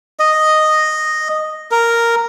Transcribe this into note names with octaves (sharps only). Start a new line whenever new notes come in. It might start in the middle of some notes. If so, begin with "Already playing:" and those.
D#5
A#4